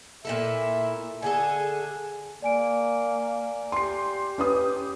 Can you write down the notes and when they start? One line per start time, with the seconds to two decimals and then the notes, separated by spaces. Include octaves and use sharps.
0.25 A#2 E4 A4 E5
1.22 D3 G#4 A4 G#5
2.42 A#3 D5 G#5 D7
3.72 G4 C6 C7
4.38 C#4 B4 D#6